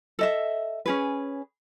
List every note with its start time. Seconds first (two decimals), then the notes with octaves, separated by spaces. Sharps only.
0.19 A4 D#5 E5
0.86 C#4 G#4 B4